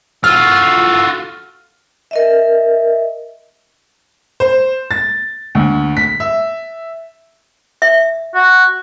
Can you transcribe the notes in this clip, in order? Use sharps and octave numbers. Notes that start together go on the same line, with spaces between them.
F4 F#4 A4 F6
A#4 D#5 E5
C5
A6
D2
B6
E5
E5
F#4